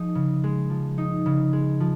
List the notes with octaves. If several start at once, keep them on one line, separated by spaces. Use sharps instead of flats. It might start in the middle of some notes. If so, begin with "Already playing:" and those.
Already playing: F3 G#3 D#4
C#3
G#3
F3
D#4
C#3
G#3
F3